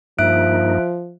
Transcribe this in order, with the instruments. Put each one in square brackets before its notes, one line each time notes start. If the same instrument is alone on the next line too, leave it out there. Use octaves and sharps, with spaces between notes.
[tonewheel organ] G2 A#3 D#4 [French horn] F3 [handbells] E5 F#6 D7